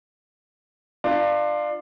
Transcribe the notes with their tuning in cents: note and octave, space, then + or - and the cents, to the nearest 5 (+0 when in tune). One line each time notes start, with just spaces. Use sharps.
D4 +25 F4 +0